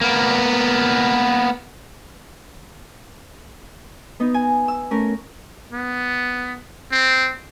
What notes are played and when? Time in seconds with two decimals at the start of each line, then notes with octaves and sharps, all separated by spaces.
0.01 A#3 B3
4.20 B3 D#4
4.34 G#5
4.68 E6
4.91 A3 C#4 A#4
5.73 B3
6.91 C4